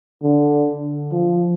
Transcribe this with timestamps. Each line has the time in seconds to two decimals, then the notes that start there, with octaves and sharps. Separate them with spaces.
0.22 D3
1.12 F3